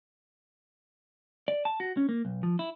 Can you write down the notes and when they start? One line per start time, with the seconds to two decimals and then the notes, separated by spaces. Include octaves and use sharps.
1.48 D5
1.65 A5
1.80 F#4
1.97 C#4
2.09 A#3
2.25 B1
2.43 F3
2.59 E4